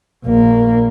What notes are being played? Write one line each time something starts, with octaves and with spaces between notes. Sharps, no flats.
A#1 A#3